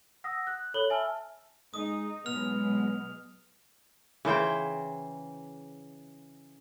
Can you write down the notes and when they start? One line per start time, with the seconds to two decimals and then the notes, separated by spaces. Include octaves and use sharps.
0.24 F#5 D#6 E6 A#6
0.47 F#6
0.74 A4 C#5 B5 F#7 G7
0.90 E5 G#5 A5 E6 F6
1.74 G#3 D#4 D#6
2.26 B2 F#3 G#3 B3 F6 F7
4.25 C#3 E3 C5 G5